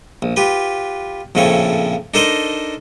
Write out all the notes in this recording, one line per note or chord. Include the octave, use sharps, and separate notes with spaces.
A#1
F4 G4 B4
A#1 F2 A2 C#3 A3 C#5
D4 D#4 A4 A#4 C5 D#5